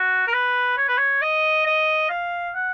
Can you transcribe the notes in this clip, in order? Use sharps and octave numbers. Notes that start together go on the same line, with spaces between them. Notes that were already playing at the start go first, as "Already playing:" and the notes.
Already playing: F#4
A#4
B4
C#5
B4
C#5
D#5
D#5
F5
F#5